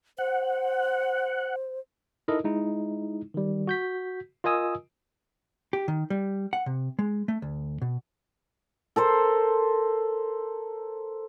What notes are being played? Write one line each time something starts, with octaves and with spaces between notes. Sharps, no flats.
C5 F#5
D#4 E4 A4 A#4 D#5
G#3 D#4 E4
D#3 G3
F#4 G6 B6
F4 A#4 D#5 G#5 D#6 E6
G4
D#3
G3
F#5
C3
G#3
A3
D2
B2
A4 A#4 C5